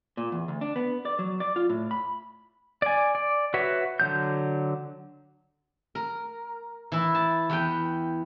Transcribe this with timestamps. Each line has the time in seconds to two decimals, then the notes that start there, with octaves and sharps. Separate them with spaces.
0.17 A#2
0.32 E2
0.48 D2
0.61 D4
0.76 B3
1.05 D5
1.19 F#3
1.40 D5
1.56 F4
1.69 A2
1.91 B5
2.82 D5 G#5
3.15 D5
3.54 F#4 B4 C#5 E5
4.00 D3 F#3 G6
5.95 A#4
6.92 E3 E4
7.15 A5
7.50 E2 B4 G5